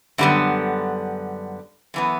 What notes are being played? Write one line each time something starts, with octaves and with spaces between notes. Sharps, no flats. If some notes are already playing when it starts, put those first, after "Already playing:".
F#2 D3 G3 B3
F#2 E3 B3